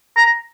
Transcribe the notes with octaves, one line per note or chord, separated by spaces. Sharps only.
A#5